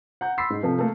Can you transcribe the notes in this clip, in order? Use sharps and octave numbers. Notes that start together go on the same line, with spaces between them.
F#5 A#5 G6
B5 C6 E6 A6 B6 C7
G#2
C3 F3 A4
A3 A#3 A4